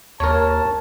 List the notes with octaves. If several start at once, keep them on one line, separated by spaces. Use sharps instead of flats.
D#2 A#4 C#5 A5